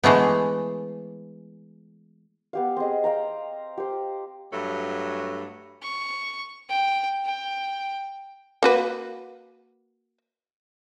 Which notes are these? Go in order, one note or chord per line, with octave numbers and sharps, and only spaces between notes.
E3 G#3 A3 B3
B3 G4 F5
C4 G#4 D#5
F5 G5 A#5
G4 C5
G2 F#3 A3
C#6
G5
G5
A#3 F#4 B4